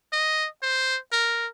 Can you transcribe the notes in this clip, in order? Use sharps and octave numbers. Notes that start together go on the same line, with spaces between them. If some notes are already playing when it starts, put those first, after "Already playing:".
D#5
C5
A#4